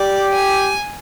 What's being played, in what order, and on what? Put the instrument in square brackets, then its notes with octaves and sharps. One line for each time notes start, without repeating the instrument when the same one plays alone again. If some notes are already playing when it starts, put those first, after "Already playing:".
Already playing: [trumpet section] G4 [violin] D5
[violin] G#5